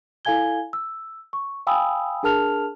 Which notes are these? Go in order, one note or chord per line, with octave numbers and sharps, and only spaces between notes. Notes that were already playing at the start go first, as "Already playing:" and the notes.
E4 A4 F5 G#5 G#6 G7
E6
C#6
F5 G5 G#5 B5 D#6 E6
D4 G#4 A#4 A5 F6 F7